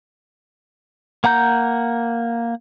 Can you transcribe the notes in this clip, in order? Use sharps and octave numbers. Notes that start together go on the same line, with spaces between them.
A#3 F#5 A#5 G6